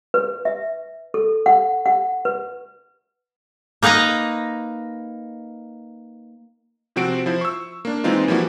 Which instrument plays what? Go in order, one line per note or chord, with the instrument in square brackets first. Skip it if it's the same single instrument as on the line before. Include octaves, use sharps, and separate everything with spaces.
[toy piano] B4
E5
A4
F#5
F#5
B4
[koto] A#3 D#4 B4 D#5 A#5
[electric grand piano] C3 F3 C4 F#4 C5 D7
F3 E4 C5
C#6 E6
A#3 D4
E3 G#3 C4 D#4 F4
E3 F3 G3 A#3 E4 F#4